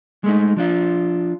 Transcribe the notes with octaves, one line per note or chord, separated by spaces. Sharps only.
G#3 A3 D#4
F3 D4 F4